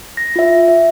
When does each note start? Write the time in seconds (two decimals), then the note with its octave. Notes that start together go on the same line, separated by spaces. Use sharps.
0.17 A#6
0.36 F4 E5
0.68 E5